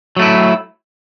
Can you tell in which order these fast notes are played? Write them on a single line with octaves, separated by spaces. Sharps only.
F#3 A3 E4